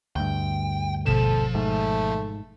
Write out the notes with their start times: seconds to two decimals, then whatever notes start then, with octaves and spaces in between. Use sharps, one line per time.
0.16 D2 G2 G5
1.06 G#1 B2 F3 A4 E7
1.55 G#2 A3